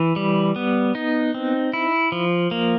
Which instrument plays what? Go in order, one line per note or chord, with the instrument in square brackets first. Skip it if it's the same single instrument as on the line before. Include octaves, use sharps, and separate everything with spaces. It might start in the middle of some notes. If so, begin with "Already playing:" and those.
Already playing: [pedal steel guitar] E3
G3
B3
D#4
C4
E4
F3
A#3